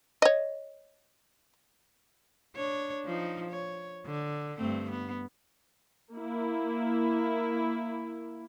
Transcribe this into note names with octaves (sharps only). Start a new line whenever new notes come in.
C#5 D#5
D4 C#5
F3 D#4
C#5
D3
G2 A3 C4
B3
A#3 E4